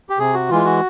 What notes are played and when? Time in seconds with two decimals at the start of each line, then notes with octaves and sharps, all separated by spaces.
0.10 G4
0.18 C3 G#4
0.34 F#4
0.50 E3 G#3 F4
0.65 F#4